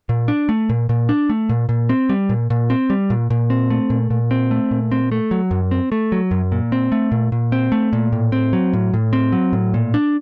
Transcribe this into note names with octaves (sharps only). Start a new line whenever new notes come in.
A#2
D4
A3
A#2
A#2
D4
A3
A#2
A#2
C4
G3
A#2
A#2
C4
G3
A#2
A#2
C4
A3
A#2
A#2
C4
A3
A#2
C4
A3
F#3
F#2
C4
A3
F#3
F#2
A#2
C4
A3
A#2
A#2
C4
A3
A#2
A2
C4
F#3
A2
A2
C4
F#3
A2
A#2
D4